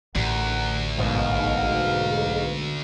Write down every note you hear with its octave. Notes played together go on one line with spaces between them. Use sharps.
A1 D2 A#4 F#5 A#5
B1 G#2 B2 A#4 F5